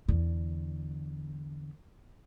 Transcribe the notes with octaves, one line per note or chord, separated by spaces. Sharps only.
E2 D3